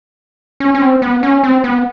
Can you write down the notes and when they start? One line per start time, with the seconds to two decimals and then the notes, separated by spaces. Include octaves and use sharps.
0.60 C#4
0.75 C#4
0.81 C4
1.02 B3
1.23 C#4
1.44 C4
1.64 B3